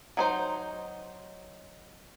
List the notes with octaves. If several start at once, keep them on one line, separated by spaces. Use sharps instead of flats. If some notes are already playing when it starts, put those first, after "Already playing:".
F#3 D#4 C5